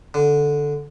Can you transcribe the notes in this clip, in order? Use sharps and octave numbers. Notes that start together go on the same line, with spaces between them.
D3